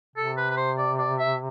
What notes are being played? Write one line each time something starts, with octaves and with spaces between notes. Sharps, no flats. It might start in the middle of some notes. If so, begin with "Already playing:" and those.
C3 A4
B4
B4
C5
D5
D5
E5